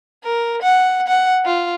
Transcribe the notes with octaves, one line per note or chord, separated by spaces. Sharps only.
A#4
F#5
F#5
F4